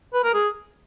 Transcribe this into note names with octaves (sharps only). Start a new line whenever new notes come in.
B4
A#4
G#4